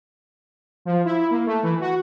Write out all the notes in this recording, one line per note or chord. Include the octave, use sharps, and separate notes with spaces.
F3
E4
A#3
A3
E3
F#4